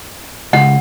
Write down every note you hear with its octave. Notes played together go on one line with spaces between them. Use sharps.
C#2 F#5